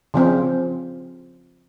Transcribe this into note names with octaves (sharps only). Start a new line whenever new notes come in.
C#3 F3 C4